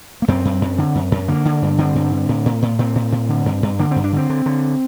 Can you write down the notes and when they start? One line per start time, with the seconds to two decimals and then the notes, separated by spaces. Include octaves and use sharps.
0.22 A#3
0.28 F#2 C4
0.45 F#2
0.62 F#2
0.78 D3
0.95 F#2
1.12 F#2
1.28 D3 A#3
1.45 D3
1.62 G2
1.78 D3 C4
1.95 G2
2.12 D3
2.29 A2
2.46 A2
2.62 A2
2.79 A2 C4
2.95 A2
3.12 A2
3.29 D3
3.46 G2
3.63 G2
3.79 D3 A#3
3.91 G2 C4
4.04 D4
4.12 D3 C4
4.29 D3
4.46 D3